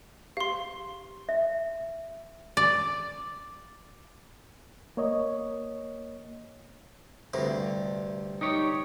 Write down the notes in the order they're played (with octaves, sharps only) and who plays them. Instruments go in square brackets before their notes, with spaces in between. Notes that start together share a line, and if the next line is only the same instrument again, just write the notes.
[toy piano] G4 [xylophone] F5 C6
[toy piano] E5
[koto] D5
[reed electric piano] A#3 C#5 D#5
[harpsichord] D2 G2 C3
[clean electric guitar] D#4 G4 C#5